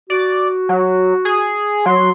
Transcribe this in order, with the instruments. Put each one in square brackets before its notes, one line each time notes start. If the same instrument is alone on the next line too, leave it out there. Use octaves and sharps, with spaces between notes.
[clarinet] F#4 [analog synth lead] D5
[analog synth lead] F#3
G#4
[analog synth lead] F#3 [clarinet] C6